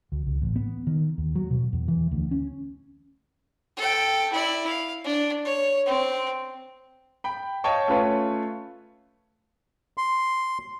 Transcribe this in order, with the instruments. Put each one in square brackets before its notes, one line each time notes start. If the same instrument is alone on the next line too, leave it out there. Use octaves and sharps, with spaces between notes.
[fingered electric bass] D2
C#2
A1
B3
D#3
D#2
F#3
B2
E2
E3
D2
C#4
[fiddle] A4 G5
E4 D5
F5
D4
C#5
C4
[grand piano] G5 B5
C#5 D#5 F5 G5 A5 C#6
A3 C#4 F4 B4 C#5
[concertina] C6